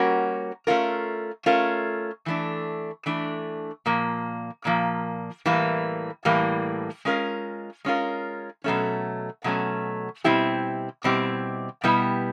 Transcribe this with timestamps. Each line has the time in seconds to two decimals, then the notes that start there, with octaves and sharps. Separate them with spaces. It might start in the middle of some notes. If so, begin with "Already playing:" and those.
Already playing: G3 A#3 C#4 F#4 A#4
0.67 A3 C#4 F4 A#4
1.46 A3 C#4 F4 A#4
2.26 E3 A3 D4
3.06 E3 A3 D4
3.86 A#2 F3 A#3
4.65 A#2 F3 A#3
5.45 A2 E3 G3 A#3
6.25 A2 E3 G3 A#3
7.05 G#3 C#4 F4 A#4
7.85 G#3 C#4 F4 A#4
8.64 B2 F#3 A3 C#4
9.44 B2 F#3 A3 C#4
10.24 B2 G3 C4 E4 G4
11.04 B2 G3 C4 E4 G4
11.84 B2 G3 B3 E4 G4